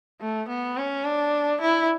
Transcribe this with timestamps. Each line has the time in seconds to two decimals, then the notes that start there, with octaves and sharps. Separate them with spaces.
0.21 A3
0.49 B3
0.77 C#4
1.05 D4
1.61 E4